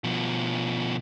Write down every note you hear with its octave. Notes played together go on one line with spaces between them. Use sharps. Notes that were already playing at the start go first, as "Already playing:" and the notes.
B2 F3